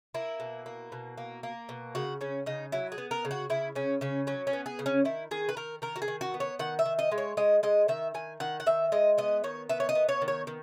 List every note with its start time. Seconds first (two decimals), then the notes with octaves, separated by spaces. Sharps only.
0.14 A#3 E4
0.40 B2
0.66 A#3
0.92 B2
1.18 A#3
1.43 A#3
1.69 B2
1.95 C#3 F#4
2.21 C#3 C#4
2.46 C#3 D#4
2.72 F#3 E4
2.92 G#4
2.98 B3
3.11 A#4
3.25 C#3
3.31 F#4
3.50 C#3 E4
3.75 C#3 C#4
4.01 C#3 C#4
4.27 F#3 C#4
4.47 C#4
4.53 B3
4.66 G#4
4.79 C#3
4.86 C#4
5.05 D#3 E4
5.31 D#3 G#4
5.49 B4
5.57 D#3 A#4
5.82 D#3 A#4
5.96 F#4
6.02 G#4
6.08 D#3
6.21 F#4
6.34 B3
6.40 C#5
6.59 D#3 F#5
6.79 E5
6.86 D#3
6.99 D#5
7.12 G#3
7.18 C#5
7.37 G#3 D#5
7.63 G#3 D#5
7.88 D#3 E5
8.14 D#3 G#5
8.40 D#3 F#5
8.60 F#5
8.66 D#3 E5
8.92 G#3 D#5
9.18 B3 D#5
9.44 D#3 C#5
9.69 B3 E5
9.80 C#5
9.89 D#5
9.95 B3
10.09 C#5
10.22 D#3
10.28 C#5
10.47 D#3